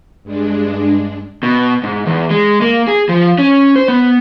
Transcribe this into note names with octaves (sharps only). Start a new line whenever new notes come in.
G2 G#3 D4
B2
G#2
E2
G#3
A#3
G#4
F3
C#4
C5
B3